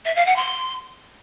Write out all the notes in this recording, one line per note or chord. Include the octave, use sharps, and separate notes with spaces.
E5
F5
F#5
C6